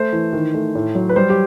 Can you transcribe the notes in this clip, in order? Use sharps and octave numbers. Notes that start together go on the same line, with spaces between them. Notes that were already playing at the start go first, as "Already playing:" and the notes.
Already playing: A3 C5
E3
D#3
A3
A2
F#3
B4
G3 C5
G4